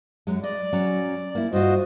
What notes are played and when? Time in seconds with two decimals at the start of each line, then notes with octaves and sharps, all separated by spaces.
0.27 F#2 F#3 G#3
0.43 D5 D#5
0.73 F#3 C#4
1.35 A#3 E4
1.53 G2 F4 F#4 C5 D#5